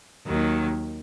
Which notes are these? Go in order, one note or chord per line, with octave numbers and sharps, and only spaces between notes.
D#2 D#3 F#3